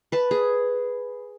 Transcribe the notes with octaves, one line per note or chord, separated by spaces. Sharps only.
B4 A5
G#4